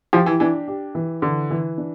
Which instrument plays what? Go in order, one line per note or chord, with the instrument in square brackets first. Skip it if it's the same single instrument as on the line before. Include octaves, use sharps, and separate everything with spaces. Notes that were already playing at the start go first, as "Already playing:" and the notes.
[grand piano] F3 [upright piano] G4
[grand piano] E3
[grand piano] E3 [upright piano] D4
[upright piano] G4
E3
[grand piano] D3 [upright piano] E3
[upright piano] E3
D4